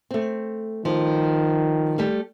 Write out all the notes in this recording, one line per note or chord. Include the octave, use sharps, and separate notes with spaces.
A3 C4
D#3 F3
G3 A3 G4